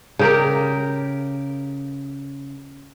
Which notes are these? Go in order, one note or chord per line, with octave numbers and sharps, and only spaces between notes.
C#3 G4 A#4